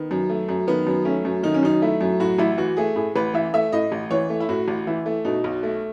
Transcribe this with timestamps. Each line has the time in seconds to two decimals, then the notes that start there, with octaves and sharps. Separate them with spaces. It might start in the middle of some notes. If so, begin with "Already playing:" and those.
Already playing: D#3 B3
0.11 F#2
0.30 A3
0.49 F#2
0.67 D#3 B3
0.87 F#2
1.05 A3 C#4
1.25 F#2
1.43 D#3 D#4
1.54 C#4
1.63 F#2 D#4
1.82 A3 E4
2.01 F#2
2.20 A2 F#4
2.39 A1 E4
2.58 E3 F#4
2.77 A3 G#4
2.96 A2 G#4
3.15 A1 B4
3.34 E3 E5
3.54 A3 E5
3.72 A2 D#5
3.92 A1
4.11 E3 C#5
4.30 A3
4.40 E4
4.49 A2 F#4
4.68 A1
4.87 E3 E4
5.06 A3
5.25 B2 D#4
5.44 B1
5.63 A3